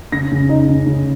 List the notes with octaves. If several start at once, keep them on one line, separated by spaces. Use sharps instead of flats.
C#3 A#6
C#3
D#4
C#3
C#3